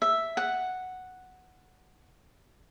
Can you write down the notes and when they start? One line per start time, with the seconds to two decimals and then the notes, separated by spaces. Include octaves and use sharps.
0.02 E5
0.37 F#5